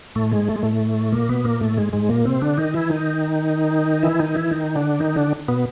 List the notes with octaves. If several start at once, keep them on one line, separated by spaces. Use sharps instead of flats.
A2 A3
G#2 G#3
A3
G#3
A2 A3
A#2 A#3
B2 B3
A#2 A#3
A2 A3
G#2 G#3
G#2 G#3
A#2 A#3
C3 C4
D3 D4
D#3 D#4
E3 E4
D#3 D#4
E3 E4
D#3 D#4
E3 E4
D#3 D#4
D3 D4
D#3 D#4
D3 D4
B2 B3